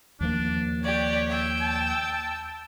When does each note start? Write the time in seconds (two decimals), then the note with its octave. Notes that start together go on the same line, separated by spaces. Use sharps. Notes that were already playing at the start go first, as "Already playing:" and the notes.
0.20 D#2 F3 A#3 D4
0.83 G4 C#5 D5
1.30 G5 E6
1.60 A5